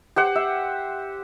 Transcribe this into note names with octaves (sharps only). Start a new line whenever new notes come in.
G4 C5 F#5
E5